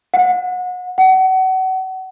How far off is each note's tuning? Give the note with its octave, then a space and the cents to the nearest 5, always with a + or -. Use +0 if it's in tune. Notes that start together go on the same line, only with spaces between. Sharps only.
F#5 -30
F#5 +30